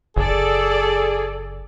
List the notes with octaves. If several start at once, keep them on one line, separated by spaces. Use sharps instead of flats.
F#1 G#4 A4 D5